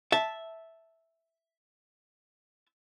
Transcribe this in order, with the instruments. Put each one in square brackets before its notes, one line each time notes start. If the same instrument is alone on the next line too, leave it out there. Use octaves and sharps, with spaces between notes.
[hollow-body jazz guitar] E5 A5